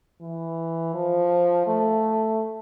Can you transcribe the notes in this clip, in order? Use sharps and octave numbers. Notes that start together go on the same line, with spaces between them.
E3
F3
A3